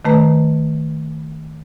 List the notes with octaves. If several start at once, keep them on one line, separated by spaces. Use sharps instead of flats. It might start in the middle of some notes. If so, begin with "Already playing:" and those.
D#3 A3 B4 A#5